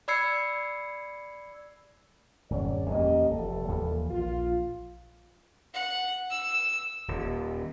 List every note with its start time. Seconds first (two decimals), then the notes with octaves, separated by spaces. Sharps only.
0.08 D5 B5 E6 G#6 C7 C#7
2.50 D1 F#2 C#5 D5
2.91 E2 A#3 C#4 G4 D#5
3.30 F1 G3 A3 A4
3.68 D#2 E3 F3
4.11 A#1 F4
5.74 F#5
6.31 E6
7.08 D#1